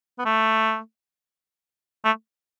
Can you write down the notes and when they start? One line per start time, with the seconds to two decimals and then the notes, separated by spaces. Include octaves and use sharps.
0.18 B3
0.25 A3
2.04 A3